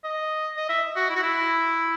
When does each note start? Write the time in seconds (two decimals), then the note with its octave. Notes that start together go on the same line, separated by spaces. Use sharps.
0.04 D#5
0.57 D#5
0.69 E5
0.96 F#4
1.10 E4
1.16 F#4
1.23 E4